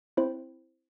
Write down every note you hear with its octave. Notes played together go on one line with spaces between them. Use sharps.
C4 E4 C5